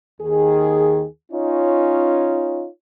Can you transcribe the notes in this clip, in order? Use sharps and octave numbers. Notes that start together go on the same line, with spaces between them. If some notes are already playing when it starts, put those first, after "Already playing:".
D#2 D#3 G#4
C#4 D#4 F4 C#5